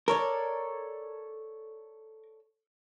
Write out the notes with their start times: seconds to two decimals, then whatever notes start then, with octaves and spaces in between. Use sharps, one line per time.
0.08 A4 A#4 C#5 D5